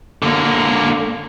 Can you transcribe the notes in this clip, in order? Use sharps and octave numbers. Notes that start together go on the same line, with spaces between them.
D3 A#3